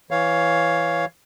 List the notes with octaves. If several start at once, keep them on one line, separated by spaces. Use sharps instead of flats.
E3 C#5 F5